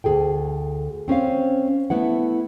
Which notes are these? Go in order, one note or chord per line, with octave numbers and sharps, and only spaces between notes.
D2 G#4 A4 G5
C4 C#4 C5 F5
A3 B3 E4 F#5